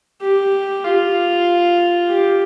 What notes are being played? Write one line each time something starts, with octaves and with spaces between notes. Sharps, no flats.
G4
F4
G4